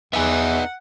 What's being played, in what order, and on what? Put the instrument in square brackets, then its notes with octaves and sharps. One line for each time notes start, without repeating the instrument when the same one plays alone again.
[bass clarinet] E2 [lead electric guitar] B3 D#4 [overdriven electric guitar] E5 G#5 [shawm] F#5